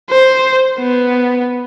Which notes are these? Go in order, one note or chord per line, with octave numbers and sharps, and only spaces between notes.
C5
B3